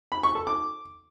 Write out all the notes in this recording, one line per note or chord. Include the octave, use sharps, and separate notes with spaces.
B5
C#6
A4
D6